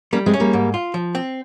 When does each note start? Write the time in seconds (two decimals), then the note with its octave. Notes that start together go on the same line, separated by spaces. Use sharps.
0.12 G3 A#3 C#4
0.26 G#3 C4
0.34 C#4
0.40 G3 A#3
0.53 G#2
0.74 F4
0.94 F3
1.15 C4